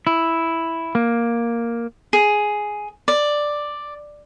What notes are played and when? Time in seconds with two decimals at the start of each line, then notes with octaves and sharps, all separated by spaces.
0.07 E4
0.95 A#3
2.13 G#4
3.08 D5